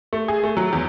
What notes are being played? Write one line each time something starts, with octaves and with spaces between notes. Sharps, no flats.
A3
G#4
A3
F#3
E2